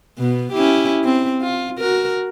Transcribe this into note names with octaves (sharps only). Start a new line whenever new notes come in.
B2 B3
C#4 E4 G4
C4
F4
F#4 A#4